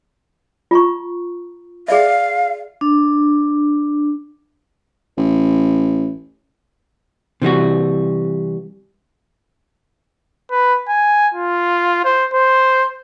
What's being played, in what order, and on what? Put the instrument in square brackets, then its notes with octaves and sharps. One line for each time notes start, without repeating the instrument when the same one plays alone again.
[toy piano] F4 A#5 C#6
[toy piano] G#4 D5 E5 [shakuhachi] F5
[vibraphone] D4
[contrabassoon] A1
[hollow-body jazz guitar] C3 E3 G3 F#4
[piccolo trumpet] B4
G#5
F4
C5
C5